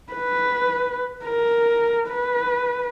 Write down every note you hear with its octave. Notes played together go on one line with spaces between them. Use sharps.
B4
A#4
B4